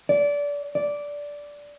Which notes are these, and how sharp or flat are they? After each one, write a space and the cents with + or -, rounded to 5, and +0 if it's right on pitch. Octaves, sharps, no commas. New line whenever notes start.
D5 -25
D5 -10